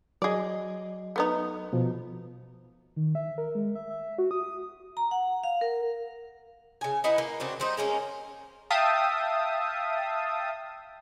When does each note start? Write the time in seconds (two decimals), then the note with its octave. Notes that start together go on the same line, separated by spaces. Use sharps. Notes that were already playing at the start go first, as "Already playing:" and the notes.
0.22 F#3 G#4 D5 D#5
1.16 A3 B3 D#4
1.73 B2 F3
2.96 D#3
3.15 E5
3.38 A#4
3.55 G#3
3.75 E5
3.90 E5
4.18 F#4
4.31 D#6
4.43 D#6
4.97 A#5
5.11 F#5
5.44 F5
5.61 A#4
6.81 C#3 G#5
7.04 D#4 E4 B4 F#5
7.18 A#3
7.40 C#3 C4 D4 F#4
7.60 G3 C4 D#4
7.77 G#3 A#3 C#4 A#4
8.70 E5 F5 G5 A5 D#6